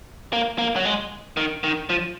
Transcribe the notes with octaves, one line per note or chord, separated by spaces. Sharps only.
A#3
A#3
F#3
G#3
D#3
D#3
F3